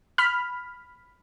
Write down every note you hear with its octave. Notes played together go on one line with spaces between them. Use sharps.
B5 F6